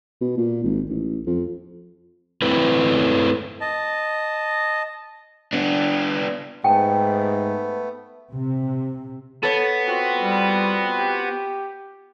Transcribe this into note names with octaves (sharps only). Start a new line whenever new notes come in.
B2
A#2
G#1
A1
F2
A3 C4 E4 B4
D#5 A5
B3 D4
G#2 A3 B3 G5 A5
C3
B3 A4 C#5
C4 F4 F#4
G3
G4